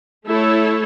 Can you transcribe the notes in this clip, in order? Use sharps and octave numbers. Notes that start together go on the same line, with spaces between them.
A3 E4 A4 C#5